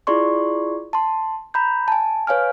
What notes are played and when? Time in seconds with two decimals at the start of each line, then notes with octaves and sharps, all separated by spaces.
0.07 E4 F4 G#4 D5 C6 C#6
0.93 A5 C6
1.54 A#5 B5 G6
1.88 G#5 A5
2.27 B4 C#5 F5 G#5 F6